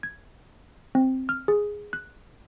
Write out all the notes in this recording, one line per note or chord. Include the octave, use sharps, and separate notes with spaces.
G#6
C4
F6
G#4
F#6